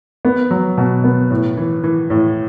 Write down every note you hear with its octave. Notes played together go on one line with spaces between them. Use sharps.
B3
F#3
B2
B3
A2
E3
E3
A2